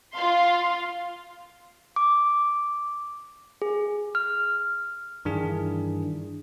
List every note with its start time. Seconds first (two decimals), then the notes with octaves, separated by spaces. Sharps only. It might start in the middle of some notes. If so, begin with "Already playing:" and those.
0.14 F4 F5 C6
1.96 D6
3.62 G#4
4.15 F6
5.25 G2 D#3 E3 D4 G#4